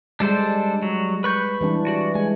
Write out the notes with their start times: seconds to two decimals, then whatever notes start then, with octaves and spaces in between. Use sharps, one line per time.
0.20 G3 G#3 D4 A4 C5
0.82 F#3
1.24 B4 C#6 G6
1.61 E3 G3 D4
1.87 F#4 D5
2.15 G#3 G#5